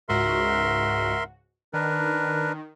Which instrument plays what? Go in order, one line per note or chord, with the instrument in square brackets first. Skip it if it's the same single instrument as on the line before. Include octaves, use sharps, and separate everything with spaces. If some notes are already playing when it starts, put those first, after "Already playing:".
[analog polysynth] C#2 G#2 F#4 [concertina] A#4 E5 C6
[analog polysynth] D#3 [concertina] D4 A#4 B4